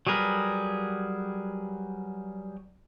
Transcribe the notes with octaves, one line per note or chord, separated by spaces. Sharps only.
F#3 G3 G#4 A#4 B4